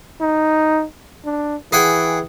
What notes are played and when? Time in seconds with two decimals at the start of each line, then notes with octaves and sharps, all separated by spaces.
0.21 D#4
1.25 D4
1.72 E3 G#4 F#5 G5